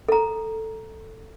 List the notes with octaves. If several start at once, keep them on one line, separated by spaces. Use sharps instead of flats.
A4 A#5